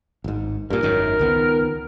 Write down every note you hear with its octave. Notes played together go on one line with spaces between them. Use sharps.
G#1 G#2
G2 A#2 A#4
G#1 F#2 D#3
C#2 D#3 B3